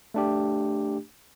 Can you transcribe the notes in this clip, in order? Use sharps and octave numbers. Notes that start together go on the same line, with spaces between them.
A3 D4 G4